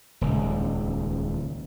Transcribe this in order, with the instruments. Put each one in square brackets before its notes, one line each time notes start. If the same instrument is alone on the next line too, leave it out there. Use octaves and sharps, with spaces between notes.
[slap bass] D#1 C#2